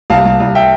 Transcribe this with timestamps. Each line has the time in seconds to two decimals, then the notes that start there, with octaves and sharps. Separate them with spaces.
0.10 C2 F5 A5
0.25 C2
0.40 C2
0.55 E5 G5